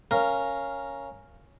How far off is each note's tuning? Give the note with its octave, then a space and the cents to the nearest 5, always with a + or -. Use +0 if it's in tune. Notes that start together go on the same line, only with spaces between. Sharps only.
C#4 +0 A#4 +0 F5 -15